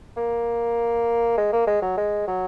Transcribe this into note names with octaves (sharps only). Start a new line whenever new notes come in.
A#3
G#3
A#3
G#3
F#3
G#3
F#3